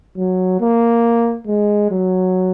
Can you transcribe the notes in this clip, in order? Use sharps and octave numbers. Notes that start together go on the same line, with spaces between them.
F#3
A#3
G#3
F#3